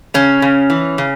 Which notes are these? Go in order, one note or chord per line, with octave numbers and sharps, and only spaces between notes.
C#3 C#4
C#3
E3
C#3